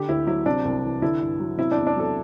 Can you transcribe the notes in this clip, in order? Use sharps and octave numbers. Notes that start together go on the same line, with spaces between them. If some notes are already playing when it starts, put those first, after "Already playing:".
Already playing: D3 G4
D2 E4
F#3 E4
C3 D4
C2
E3
D3 E4
G2
F#3
C3 E4
D4
E2
D4
F#3 A4